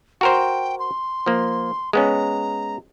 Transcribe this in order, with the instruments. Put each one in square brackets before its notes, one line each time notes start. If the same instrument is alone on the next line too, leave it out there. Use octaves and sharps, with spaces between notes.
[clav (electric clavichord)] F#4 A#4 C5 [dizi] G5
[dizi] C6
[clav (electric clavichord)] F3 A#3
[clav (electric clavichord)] G#3 B3 C#4 [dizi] A#5